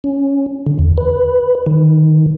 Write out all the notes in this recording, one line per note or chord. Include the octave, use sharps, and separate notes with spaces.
C#4
D3
E2
B4
D#3